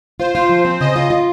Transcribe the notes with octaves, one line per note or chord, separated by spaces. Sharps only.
F4 C5
F4
F3
C4
C#3 D#5
F4
F4